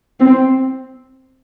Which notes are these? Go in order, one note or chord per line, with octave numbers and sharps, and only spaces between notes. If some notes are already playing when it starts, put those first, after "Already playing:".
C4